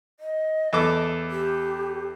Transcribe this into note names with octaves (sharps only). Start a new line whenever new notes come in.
D#5
E2 A4 D6
G4